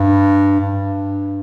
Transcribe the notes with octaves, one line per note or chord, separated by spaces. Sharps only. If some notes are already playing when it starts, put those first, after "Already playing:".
Already playing: G2
G2